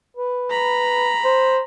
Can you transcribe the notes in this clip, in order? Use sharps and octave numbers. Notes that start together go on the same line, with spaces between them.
B4
A#5 B5
C5